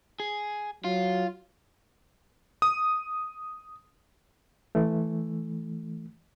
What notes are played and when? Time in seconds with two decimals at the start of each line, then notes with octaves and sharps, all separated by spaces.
0.20 G#4
0.84 F#3 F4
2.62 D#6
4.75 E3 A3